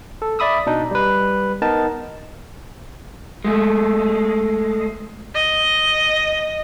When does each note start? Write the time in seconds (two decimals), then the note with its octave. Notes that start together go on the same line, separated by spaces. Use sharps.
0.22 A4
0.39 D5 E5 B5 D#6 E6
0.66 B2 D4 D#4
0.91 G3 B4
1.62 B3 D#4 A#4 A5
3.45 G#3 A3
5.35 D#5